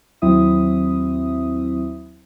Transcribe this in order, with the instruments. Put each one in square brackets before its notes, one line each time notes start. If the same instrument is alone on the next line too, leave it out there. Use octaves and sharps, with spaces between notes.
[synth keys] D#2 F#3 C4 E4 E5 D#6